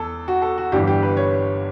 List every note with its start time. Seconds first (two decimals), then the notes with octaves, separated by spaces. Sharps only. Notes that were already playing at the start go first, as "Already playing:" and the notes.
Already playing: E2 A4
0.28 F#4
0.42 A4
0.58 F#4
0.72 G1 G2 E3 G3 G4
0.87 G4
1.03 B4
1.17 C#5